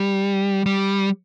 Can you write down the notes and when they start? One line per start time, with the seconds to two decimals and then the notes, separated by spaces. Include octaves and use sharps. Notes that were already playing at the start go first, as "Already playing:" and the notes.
Already playing: G3
0.66 G3